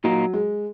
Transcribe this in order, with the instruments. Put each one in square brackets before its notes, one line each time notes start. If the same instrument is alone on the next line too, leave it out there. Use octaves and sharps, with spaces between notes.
[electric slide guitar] A#2 A#3 D#4 [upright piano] F#3
[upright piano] G#3